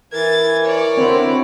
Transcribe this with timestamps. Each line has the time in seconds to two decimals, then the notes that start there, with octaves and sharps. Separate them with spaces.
0.13 E3 A#4 G#6 A6
0.67 C#5 D5
0.97 D3 C4 E4 F#4 C5